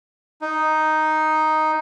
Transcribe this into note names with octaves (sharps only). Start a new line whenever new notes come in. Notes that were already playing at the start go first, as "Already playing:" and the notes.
D#4